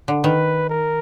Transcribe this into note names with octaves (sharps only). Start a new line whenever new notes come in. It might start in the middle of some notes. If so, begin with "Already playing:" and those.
D3
D#3 B4
A#4